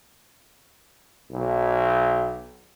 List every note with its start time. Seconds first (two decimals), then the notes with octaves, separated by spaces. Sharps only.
1.31 B1